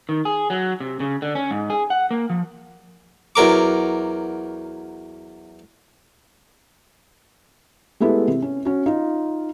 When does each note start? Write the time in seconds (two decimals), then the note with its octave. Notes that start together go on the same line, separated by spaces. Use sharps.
0.09 D#3
0.25 G#4
0.50 F#3
0.80 C3
1.00 C#3
1.22 D3
1.35 C#4
1.51 G#2
1.70 G#4
1.90 F#5
2.11 A#3
2.30 F3
3.36 E2 F#3 A#4 D6
8.00 G#3 A3 B3 E4 G4
8.28 C3
8.42 C#4
8.65 C#4 F#4
8.86 D#4 F4